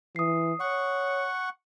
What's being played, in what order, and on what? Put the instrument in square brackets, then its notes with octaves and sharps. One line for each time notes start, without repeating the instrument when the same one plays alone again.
[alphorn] E3 [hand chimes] D#6 C7
[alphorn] C#5 [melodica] F#5 C#6